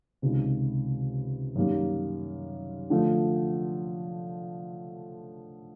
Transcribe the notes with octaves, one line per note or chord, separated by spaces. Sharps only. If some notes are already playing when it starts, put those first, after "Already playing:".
C#2 C3 D#3 G#3
F#2 D#3 G3 A#3
D3 F3 A3